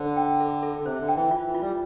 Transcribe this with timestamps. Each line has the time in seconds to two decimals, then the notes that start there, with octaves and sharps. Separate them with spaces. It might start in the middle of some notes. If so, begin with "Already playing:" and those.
Already playing: D3 C5
0.17 G5
0.40 A4
0.63 A4
0.79 D3
0.85 C3 C5
1.01 D3
1.08 G5
1.16 E3
1.31 F4
1.47 E3
1.54 F4
1.61 G3